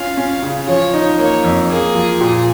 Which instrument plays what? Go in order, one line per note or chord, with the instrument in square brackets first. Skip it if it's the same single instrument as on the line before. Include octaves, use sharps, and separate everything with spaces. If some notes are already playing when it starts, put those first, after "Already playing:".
Already playing: [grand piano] C#4 F4 [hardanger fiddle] F5
[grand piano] C#4
C#3
[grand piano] F3 [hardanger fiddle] C#5
[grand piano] D#4
[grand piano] A#3 [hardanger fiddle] C#5
[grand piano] F2
[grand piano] A#3 [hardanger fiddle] G#4
[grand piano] F3
A#2